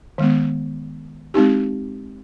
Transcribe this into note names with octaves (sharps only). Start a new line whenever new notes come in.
D#3 G#3 B3
G#3 C4 D#4 G4